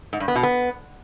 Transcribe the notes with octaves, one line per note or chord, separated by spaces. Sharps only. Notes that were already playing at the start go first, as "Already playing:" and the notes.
G#2
G2
B3
B2
B3